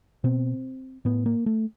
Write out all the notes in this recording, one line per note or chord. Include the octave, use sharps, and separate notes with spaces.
B2 C4
A2 B3
A#3
A3